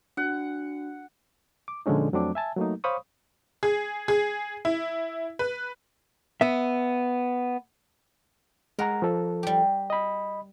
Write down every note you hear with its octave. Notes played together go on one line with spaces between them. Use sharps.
D4 F#4 F#5
D6
A#2 D3 F3 G#3 C#4 D#4
F2 F#3 A3 C4 D4 D6
E5 G#5 A5
F#3 A3 A#3 D#4
C5 C#5 F5 B5 C#6 D#6
G#4
G#4
E4
B4
B3 E5
G#3 A#4 F#5 A#5
F3 A4
G3 G4
D#5 B5